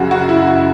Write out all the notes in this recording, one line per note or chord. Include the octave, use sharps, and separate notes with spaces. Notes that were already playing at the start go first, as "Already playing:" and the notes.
Already playing: F#2 C#3 F#4 G#4
F#4
E4
F#4